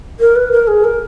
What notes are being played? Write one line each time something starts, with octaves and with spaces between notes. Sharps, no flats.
A#4
B4
A#4
G#4
A#4